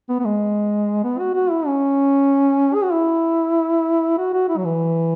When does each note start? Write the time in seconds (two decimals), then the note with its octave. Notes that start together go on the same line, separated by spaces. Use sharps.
0.09 B3
0.19 B3
0.25 G#3
1.03 B3
1.19 F#4
1.35 F#4
1.51 E4
1.67 C#4
2.74 G#4
2.83 F#4
2.92 E4
4.18 F#4
4.33 F#4
4.49 E4
4.57 F#3
4.65 E3